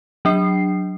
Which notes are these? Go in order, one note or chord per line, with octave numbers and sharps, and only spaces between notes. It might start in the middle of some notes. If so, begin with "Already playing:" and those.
F#3 D4 C7